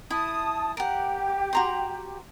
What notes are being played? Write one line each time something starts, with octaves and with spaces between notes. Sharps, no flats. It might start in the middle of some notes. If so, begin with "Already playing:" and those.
E4 A5 D#6
G4 A#4 F#5
F#4 A#5 C6